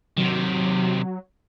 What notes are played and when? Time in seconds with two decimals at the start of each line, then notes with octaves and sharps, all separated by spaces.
0.17 C3 D#3 F#3